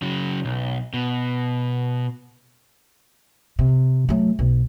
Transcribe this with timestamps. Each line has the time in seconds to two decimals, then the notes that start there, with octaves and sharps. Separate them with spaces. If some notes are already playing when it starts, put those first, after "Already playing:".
0.02 C#3 F#3
0.45 B1
0.94 B2
3.59 C3
4.09 F#3 A3
4.39 B1